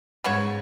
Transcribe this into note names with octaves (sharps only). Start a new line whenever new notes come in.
G#2 C#3 B3 F#4 C#5